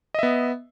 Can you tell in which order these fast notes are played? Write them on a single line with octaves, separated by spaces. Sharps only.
D#5 E5 B3